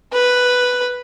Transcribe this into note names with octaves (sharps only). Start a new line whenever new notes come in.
B4